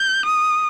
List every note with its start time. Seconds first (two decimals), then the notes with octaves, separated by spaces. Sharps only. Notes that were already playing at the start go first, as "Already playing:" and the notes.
Already playing: G6
0.25 D#6